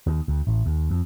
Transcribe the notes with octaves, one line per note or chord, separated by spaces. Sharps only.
D#2
D2
A1
D#2
F2